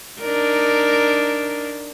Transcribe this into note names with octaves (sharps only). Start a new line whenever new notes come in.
D4 D#4 A#4